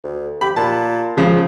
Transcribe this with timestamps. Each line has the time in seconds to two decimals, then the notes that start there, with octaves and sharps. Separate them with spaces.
0.03 D2
0.41 G4 B5
0.56 A#2 A5
1.17 C#3 F3 G#3